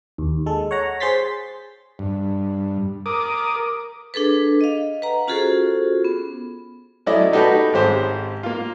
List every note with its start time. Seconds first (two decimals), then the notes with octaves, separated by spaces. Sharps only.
0.18 D#2
0.46 G#3 A4
0.71 C#5 F#5 A#5
1.00 G#4 C5 C6 A6 B6
1.99 G2
3.06 A#4 D6 D#6
4.14 D4 G#4 A4 B4
4.61 D#5 F5
5.02 B4 F#5 A#5
5.28 C#4 F4 F#4 G#4 A4 C5
6.04 B3
7.06 F#3 A3 C#4 E4 D5 D#5
7.32 A3 D#4 F#4 G4 A4 B4
7.73 G#1 G#2 C#4 G4 C5
8.43 A#3 F4